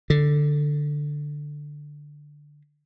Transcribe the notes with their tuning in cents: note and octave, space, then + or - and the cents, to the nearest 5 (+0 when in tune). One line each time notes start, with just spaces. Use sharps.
D3 +5